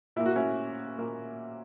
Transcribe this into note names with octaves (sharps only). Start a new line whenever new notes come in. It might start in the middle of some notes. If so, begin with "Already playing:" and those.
A#2 A#3 E4
F#4
C#4 E4
A#2 A#3